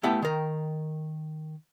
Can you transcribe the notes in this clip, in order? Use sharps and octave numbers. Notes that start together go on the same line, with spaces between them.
A3 B3 E4 G4 F#5 A5
D#3 A#4